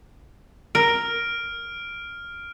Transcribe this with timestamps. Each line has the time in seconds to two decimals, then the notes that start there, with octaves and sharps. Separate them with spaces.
0.75 A#4 F6 D7